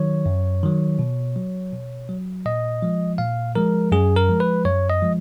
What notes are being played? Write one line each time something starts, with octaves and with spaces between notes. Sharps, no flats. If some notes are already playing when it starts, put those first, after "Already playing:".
Already playing: D#3 F#3 C#5
F#2
D#3 F#3
B2
F#3
B2
F#3
A#2 D#5
F3 G#3
A#2 F5
F3 G#3 A#4
F#2 G#4
A#4
F3 G#3
B4
F#2 C#5
D#5
F3 G#3